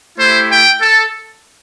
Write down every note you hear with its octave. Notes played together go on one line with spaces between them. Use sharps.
A3 E4 G4 C5
G5
A4